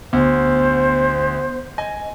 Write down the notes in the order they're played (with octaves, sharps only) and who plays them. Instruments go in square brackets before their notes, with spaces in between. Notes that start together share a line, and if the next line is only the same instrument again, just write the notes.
[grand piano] D2 [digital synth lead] B3 [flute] C5
[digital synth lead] D#5 [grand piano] G#5